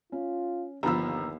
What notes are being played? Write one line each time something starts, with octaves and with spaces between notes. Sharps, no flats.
C#4 F4
G1 D#2 F3 A#5 B5 E6